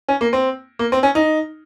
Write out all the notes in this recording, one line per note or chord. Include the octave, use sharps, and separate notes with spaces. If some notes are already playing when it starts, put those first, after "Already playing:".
C#4
A#3
C4
A#3
C4
C#4
D#4